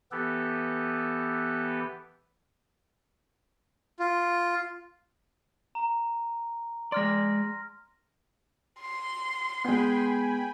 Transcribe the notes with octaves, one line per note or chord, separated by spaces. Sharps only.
E3 B3 G4 A4 B4
F4
A#5
G#3 D5 C6 F6 A#6
C6
G#3 B3 G5 G#5 B5